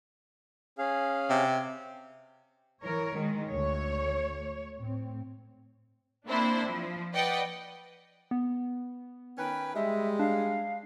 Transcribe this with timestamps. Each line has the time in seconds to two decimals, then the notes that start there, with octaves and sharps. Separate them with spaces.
0.78 C#4 G#4 F5
1.30 C3
2.83 E3 A#4 C#5
3.16 D#3 G#3
3.49 D2 D3 A3 C#5
4.77 A2 C4
6.26 A#3 C4 D4 E4 C5
6.66 F3
7.14 B4 D5 D#5 F#5 G5
8.31 B3
9.38 D#3 C#4 B4 G5
9.75 G3 G#3 E5
10.19 D4 F5